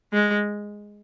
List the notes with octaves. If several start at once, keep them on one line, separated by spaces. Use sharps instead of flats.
G#3